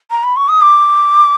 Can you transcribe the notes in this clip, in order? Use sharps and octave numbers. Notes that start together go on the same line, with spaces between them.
A#5
B5
C#6
D#6
D6